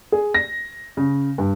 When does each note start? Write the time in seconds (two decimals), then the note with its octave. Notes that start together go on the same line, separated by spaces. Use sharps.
0.12 G#4
0.34 A#6
0.97 C#3
1.38 G2